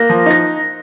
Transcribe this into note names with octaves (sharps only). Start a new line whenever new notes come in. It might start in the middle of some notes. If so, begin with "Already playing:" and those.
Already playing: A#3 A#6
F3
D#4 A#6